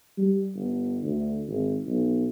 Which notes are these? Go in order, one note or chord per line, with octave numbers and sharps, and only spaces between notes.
G3
G1
D2
G#1
B1